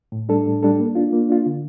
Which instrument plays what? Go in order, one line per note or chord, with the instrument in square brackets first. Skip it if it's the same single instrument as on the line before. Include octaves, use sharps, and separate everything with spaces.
[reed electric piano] A2
G3 D4 A4
A2
G3 D4 A4
A#3
D4 F4
A#3
D4 F4
D3